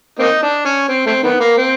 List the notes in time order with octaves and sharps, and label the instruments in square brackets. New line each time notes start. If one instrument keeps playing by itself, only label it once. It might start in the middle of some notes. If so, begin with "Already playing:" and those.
[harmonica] A#3 C4 D#4
D4
C#4
C4
A3 C4
D#3 B3
A#3
C4